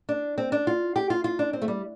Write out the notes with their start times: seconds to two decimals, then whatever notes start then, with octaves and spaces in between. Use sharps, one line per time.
0.09 D4
0.38 C4
0.52 D4
0.67 F4
0.96 G4
1.10 F4
1.24 F4
1.39 D4
1.53 C4
1.62 A3
1.68 G3